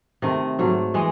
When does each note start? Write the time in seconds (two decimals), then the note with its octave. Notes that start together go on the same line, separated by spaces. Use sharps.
0.22 C3 D#3 A3 D#5
0.59 G#2 F#3 A3
0.94 E3 G#3 D#5